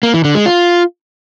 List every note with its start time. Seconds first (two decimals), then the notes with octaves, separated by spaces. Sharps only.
0.03 A#3
0.14 E3
0.24 D3
0.35 G#3
0.46 F4